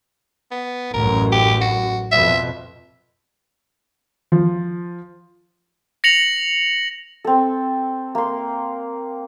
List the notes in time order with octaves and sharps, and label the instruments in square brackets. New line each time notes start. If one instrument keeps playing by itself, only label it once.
[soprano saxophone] B3
[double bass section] A1 F#2 [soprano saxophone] A#4
[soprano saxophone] G4
F#4
[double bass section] F2 B2 [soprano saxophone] E5
[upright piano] F3
[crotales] A#6 C#7 F7 F#7
[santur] C4 A4
A#3 C6